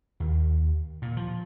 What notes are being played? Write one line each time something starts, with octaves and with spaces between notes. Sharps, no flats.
D#2
A#2
F3